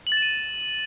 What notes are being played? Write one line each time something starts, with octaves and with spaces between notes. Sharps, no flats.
F#7
A6
E7
D#7